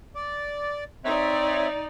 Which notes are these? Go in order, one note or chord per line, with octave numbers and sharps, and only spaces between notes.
D5
C4 D#4 C#5 D5 E5